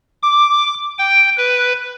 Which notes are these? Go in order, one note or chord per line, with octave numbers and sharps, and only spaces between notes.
D6
G5
B4